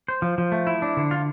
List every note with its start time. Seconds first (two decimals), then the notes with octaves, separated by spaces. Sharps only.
0.08 C5
0.22 F3
0.38 F3
0.52 A3
0.67 E4
0.82 D4
0.97 D3
1.11 F4